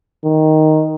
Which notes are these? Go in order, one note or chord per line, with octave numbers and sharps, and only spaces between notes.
D#3